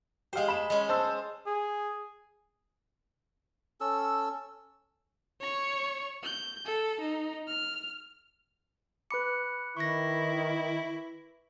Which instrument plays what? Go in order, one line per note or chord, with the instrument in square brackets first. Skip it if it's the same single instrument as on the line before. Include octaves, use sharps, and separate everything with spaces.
[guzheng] G#3 C5 [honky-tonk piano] G4 F5
[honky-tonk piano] B5 E7
[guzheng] G#3 C#4
[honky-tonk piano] C5 A5 E6
[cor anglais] G#4
[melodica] C#4 A4 E6
[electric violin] C#5 C#6
G6
A4
D#4
F6
[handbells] B4 B5 D6 [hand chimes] F#6 C#7
[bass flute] D#3 [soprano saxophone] E4 [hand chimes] C#6 A#6